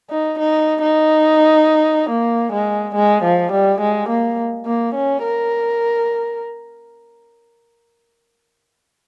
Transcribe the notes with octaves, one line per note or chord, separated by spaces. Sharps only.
D#4
D#4
D#4
A#3
G#3
G#3
F3
G3
G#3
A#3
A#3
C#4
A#4